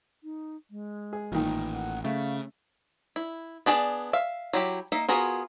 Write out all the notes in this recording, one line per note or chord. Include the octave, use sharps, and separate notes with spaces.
D#4
G#3
G#4
A1 A#2 D#3
F#5
C#3 A3 F5
E4
B3 D4 G#4 F#5 A5
E5 F5
F#3 E4 G4
A#3 D#4 E5
B3 F4 F#4 G#4 A#4